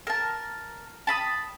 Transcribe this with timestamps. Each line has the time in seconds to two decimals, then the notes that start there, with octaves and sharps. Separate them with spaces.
0.07 A#4 A5
1.07 A5 B5 D#6